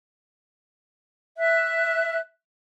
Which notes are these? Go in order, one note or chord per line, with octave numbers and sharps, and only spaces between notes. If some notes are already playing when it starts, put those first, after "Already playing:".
E5 F#6